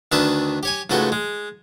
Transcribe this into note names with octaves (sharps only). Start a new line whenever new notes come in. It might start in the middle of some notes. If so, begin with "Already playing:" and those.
D2 D#3 D4 B4 E5 A5
G4 C#5 G#5
C#2 G#2 A3 F#4 B4 G5
G#3